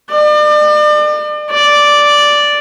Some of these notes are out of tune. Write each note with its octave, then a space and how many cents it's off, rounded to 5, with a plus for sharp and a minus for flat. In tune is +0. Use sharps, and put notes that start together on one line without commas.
D5 +40
D5 -5